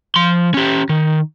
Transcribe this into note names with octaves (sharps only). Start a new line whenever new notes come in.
F3 C6
C#4 G4
D#3